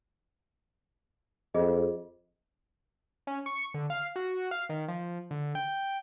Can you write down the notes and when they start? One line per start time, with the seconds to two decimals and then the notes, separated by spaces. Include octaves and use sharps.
1.54 F2 F4 G#4 D#5
3.27 C#4
3.46 C#6
3.74 D3
3.90 F5
4.16 F#4
4.51 F5
4.69 D#3
4.88 F3
5.31 D3
5.55 G5